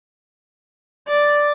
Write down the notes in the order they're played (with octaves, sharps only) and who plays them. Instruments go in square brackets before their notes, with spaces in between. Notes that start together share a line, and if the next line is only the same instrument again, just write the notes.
[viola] D5